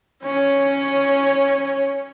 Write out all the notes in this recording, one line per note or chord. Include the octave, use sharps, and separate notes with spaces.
C#4 C#5